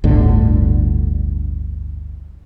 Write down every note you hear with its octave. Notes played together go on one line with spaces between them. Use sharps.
G1 D2 A2 D3